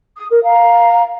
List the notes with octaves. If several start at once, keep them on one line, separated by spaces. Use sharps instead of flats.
D#6
A#4
F5 A#5